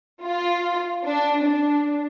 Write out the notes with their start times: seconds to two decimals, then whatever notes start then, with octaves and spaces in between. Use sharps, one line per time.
0.23 F4
1.05 D4
1.44 D4